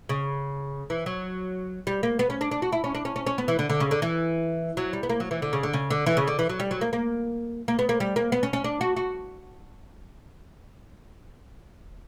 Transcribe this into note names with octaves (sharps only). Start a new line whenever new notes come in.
C#3
E3
F#3
G3
A#3
B3
C#4
D4
D4
F#4
E4
C#4
D4
C#4
C#4
C#4
B3
E3
D3
D3
C#3
D3
E3
F#3
G3
B3
A#3
F#3
E3
D3
C#3
D3
C#3
D3
E3
C#3
D3
E3
F#3
G3
F#3
A#3
A#3
A#3
B3
A#3
G3
A#3
B3
C#4
C#4
D4
F#4
F#4